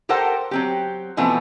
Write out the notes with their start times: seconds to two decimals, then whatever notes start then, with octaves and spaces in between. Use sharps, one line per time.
0.09 G4 A4 A#4 C5 F#5 G5
0.51 F#3 C4 G4
1.17 B2 E3 F3 A3 B3 C4